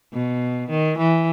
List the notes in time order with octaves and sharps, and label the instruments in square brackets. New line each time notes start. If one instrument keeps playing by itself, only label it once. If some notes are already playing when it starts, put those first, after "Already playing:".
[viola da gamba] B2
D#3
E3